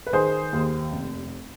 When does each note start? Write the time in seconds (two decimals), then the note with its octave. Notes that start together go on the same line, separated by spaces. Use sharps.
0.07 B4
0.13 D#3 G#4 C5
0.53 D#2
0.93 F1